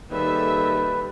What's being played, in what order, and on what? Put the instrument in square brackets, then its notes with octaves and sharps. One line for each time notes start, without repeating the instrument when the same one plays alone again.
[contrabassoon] D#2 [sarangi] G3 [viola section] G#4 A4 E5 [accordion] B4